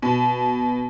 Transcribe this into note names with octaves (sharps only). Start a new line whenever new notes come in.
B2